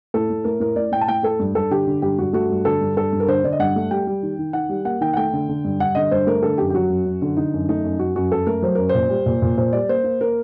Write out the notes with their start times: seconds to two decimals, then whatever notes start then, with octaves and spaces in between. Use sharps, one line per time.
0.14 A2 A4
0.30 A2
0.44 A2 A#4
0.60 A2 A#4
0.76 A2 D5
0.92 A2 G5
1.01 A5
1.08 A2 G5
1.23 A3 A4
1.40 G2
1.54 G2 A4
1.71 D3 G4
1.87 D3
2.02 G2 G4
2.19 G2 F#4
2.33 A3 F#4
2.49 G2
2.65 D3 A4
2.81 G2
2.96 G2 A4
3.12 G2
3.20 A#4
3.27 D3 C5
3.44 D3 D5
3.52 D#5
3.59 G2 F#5
3.76 A3
3.91 G3 G5
4.07 G3
4.23 D#3
4.39 D#3
4.53 D#3 F#5
4.69 G3
4.85 A#3 F#5
5.01 D#3 G5
5.13 F#5
5.17 A3 G5
5.33 D3
5.49 D3
5.64 G2
5.79 G2 F#5
5.95 D3 D#5
6.11 G2 C5
6.27 A3 A#4
6.43 D3 A4
6.58 F#2 G4
6.70 G4
6.74 F#3 F#4
6.90 F#2
7.05 F#2
7.22 D3
7.37 D3 D#4
7.53 F#2
7.69 A3 D#4
7.84 F#2
7.99 F#2 F#4
8.16 F#2 F#4
8.31 F#2 A4
8.47 A3 A#4
8.62 F#3 C5
8.75 F#2 A#4
8.89 C5
8.95 A#2
9.10 G3
9.26 A#2
9.42 A#2
9.58 A#2 C5
9.72 G3 D5
9.89 A#3 C5
10.04 A#3
10.21 A#3 A#4